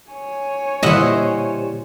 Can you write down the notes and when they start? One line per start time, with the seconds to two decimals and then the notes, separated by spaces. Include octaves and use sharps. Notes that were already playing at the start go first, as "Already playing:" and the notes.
0.12 C#5 G#5
0.83 A#2 D3 G3 E4 C5 D#5 E5 F#5